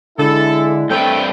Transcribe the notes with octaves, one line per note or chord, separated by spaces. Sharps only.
D3 G#3 E4 A4
G2 A3 C4 B4 G5